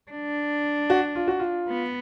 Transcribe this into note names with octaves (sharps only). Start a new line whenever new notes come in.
D4
F#4
F4
F#4
F4
B3